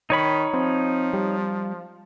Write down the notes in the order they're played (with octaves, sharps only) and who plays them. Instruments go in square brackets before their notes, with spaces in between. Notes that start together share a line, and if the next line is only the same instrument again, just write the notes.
[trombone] D#3 [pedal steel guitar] D#4 C#5 B5
[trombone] F3 [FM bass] C4
[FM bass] G3